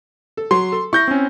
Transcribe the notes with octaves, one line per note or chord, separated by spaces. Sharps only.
A4
F#3 C6
A4
E4 C#6 G6 A#6
C4 C#4